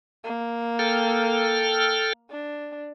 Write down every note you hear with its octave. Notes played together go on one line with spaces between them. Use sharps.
A#3
A4 G5 F6
D4